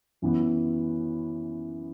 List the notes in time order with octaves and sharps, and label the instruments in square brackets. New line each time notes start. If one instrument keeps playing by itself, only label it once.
[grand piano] F#2 E3 B3